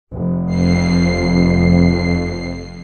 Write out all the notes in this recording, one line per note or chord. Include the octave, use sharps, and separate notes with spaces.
F1
F2 C7